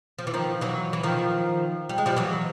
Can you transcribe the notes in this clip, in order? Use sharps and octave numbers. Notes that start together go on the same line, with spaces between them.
F3
E3
D#3 F3
E3 F#3
E3
D#3 F3
G3
G#3
F3 G3
E3 F#3